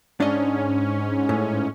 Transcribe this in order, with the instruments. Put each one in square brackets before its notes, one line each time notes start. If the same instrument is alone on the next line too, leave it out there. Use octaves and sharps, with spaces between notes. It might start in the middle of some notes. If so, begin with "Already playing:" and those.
[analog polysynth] G#2 C#4 [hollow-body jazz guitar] D4 D#5
[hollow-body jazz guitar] A2